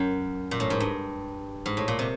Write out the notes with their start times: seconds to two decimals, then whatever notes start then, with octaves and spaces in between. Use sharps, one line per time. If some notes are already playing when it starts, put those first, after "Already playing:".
Already playing: F#2
0.51 A#2
0.60 A2
0.70 G#2
0.80 G2
1.66 G#2
1.77 A2
1.88 A#2
1.99 C3